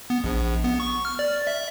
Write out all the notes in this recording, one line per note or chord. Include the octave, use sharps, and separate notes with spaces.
B3
A#1
B3
C#6
F6
D5
E5